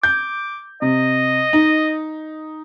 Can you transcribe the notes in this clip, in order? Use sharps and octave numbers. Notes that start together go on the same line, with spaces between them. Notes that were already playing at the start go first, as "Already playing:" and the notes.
D6 G6
C3 D#5
D#4